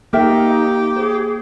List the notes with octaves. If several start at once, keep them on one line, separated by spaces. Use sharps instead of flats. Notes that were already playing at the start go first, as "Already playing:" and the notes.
A#3 D#4 G4 A#4 E5 G5
G#4 C5